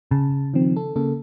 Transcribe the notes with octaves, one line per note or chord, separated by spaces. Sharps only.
C#3 A5
D#3 F3 C4
A4
C#3 A#3 A4